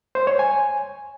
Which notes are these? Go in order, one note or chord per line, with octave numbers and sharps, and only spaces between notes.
C5
C#5
G#5